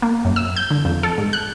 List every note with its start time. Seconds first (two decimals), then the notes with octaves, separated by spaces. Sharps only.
0.02 A#3
0.25 F#2
0.36 E6
0.56 G6
0.71 D3
0.85 F2
1.03 A4
1.18 G#2
1.33 F#6